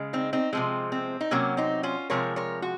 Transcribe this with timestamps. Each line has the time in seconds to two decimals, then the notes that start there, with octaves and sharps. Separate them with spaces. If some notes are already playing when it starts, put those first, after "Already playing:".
Already playing: C#3 G#3
0.13 C4 D#4
0.33 C4 D#4
0.53 C3 F3 G#3 C4
0.92 C4
1.21 D#4
1.31 C3 F#3 A#3 C#4
1.57 C4 D#4
1.83 C#4 F4
2.10 C3 F3 G#3 A#4 C#5
2.36 A#4 C#5
2.62 F#4